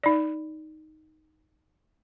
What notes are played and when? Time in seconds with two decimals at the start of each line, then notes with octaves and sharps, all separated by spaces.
0.03 D#4 D5